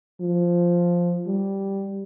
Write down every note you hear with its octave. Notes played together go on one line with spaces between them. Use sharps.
F3
G3